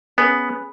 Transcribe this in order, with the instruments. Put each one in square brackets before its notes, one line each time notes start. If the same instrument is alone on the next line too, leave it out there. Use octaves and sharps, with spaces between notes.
[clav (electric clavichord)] B3 [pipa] C#4 G#4 B4